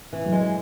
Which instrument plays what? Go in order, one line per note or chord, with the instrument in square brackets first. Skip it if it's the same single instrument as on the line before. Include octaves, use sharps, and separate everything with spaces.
[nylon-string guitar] E3
[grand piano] F#2
[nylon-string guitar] G#3